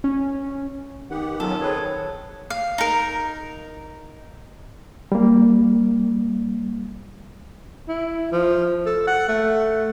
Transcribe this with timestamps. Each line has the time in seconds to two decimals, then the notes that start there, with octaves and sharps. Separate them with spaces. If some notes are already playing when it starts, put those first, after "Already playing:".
0.04 C#4
1.10 D#3 B3 G4 F#5
1.40 F#3 B3 C#4 F4 A4
1.61 C4 G#4 B4 C#5
2.50 F5
2.78 D#4 A#4
5.12 G3 A#3
7.88 E4
8.32 F3
8.86 A4
9.07 F#5
9.28 A3